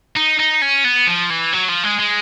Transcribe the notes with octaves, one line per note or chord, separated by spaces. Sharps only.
D#4
D#4
C#4
B3
F3
E3
F#3
F3
G#3
G#3